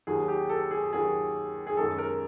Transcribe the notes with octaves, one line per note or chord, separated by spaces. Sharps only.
D#2 D#3 F#3 G#4
G4
A4
G#4
D#2 D#3 F#3 G#4
G#4
F#2 D#3 G#3 A4
A#4